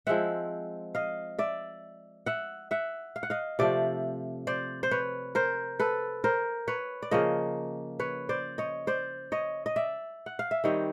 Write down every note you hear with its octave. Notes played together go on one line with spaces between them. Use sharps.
F3 G#3 C4 E5 F#5
D#5 F5
D5 E5
E5 F#5
E5 F#5
F5
F#5
D#5 F5
C3 F3 A3 D5 E5
C5 D5
C5
B4 C#5
A#4 C5
A4 B4
A#4 C5
B4 C#5
D5
C#3 F3 A#3 C#5 D#5
B4 C#5
C5 D5
C#5 D#5
C5 D5
C#5 D#5
D#5
D5 E5
F#5
F5
E5
D#3 G3 C4 C#5 D#5